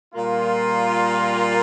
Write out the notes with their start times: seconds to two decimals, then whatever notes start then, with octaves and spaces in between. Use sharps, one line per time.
0.14 A#2 G3 A#3 F4